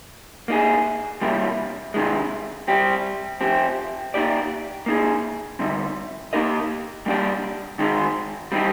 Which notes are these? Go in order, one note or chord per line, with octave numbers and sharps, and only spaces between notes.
A#3 D#4 G#4
C3 G3 A#3
C3 D#3 G#3
G3 C4 G4
F3 C4 G4
A#3 D#4 G4 D5
A#3 D#4 G#4
D3 G3 C4 D#4
A#3 D#4 G4 A#4 D#5
G3 A#3 D4 G4 D5
D#3 G#3 C4 D#4
G3 C4 D#4 G4